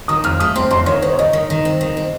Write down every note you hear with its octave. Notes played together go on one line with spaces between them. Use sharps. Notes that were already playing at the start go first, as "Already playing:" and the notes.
D#3 D#6
F2 F6
A3 D#6
C4 C6
F2 C6
D#3 C#5
D#3 C5
C#5
D#3 D#5
D#3
D#3
C4
D#3
C4